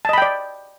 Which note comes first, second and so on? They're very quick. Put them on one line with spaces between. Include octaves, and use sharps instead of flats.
A5 D#5 B5 G5 D5